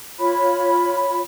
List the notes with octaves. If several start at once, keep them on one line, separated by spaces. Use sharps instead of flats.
F4 C#5 B5